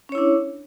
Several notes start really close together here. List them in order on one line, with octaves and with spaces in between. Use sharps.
C#4 C#5 E4 D4